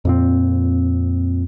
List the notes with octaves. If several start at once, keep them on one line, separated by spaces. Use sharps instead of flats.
F2 A#2 C4